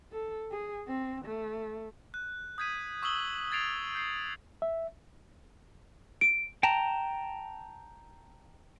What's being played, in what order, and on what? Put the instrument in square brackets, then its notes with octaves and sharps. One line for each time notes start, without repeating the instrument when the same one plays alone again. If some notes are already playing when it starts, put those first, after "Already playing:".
[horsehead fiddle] A4
G#4
C4
A3
[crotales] F#6
D#6 G6 G#6 B6 D#7
C#6 D#6 E6 F#7 G7
G#6 A6 C7 D7 F7
G6 C7
[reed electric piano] E5
[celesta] D7
[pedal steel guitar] G5 A5 A#5